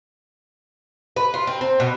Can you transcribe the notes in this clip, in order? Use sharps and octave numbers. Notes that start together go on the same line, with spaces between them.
B4
F4
C4
C4
B2